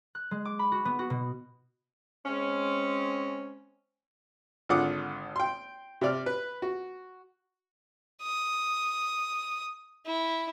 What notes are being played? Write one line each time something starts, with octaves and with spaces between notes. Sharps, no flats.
F#6
G#3
D6
B5
F#4
B3
F#4
B2
G#3 C4 C#4
G#1 D3 F4 F#5 D6 D#6
G5 C6
C3 D5 F6
B4
F#4
D#6
E4